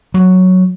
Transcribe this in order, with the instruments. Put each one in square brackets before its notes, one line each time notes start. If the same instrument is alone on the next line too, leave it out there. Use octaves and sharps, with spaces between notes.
[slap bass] F#3